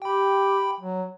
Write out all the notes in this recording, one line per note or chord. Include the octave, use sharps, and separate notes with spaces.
G4 G5 B5
F#3